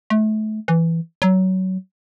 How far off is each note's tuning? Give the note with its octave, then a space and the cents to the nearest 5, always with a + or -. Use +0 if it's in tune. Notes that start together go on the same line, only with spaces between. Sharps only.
A3 -30
E3 +5
F#3 +20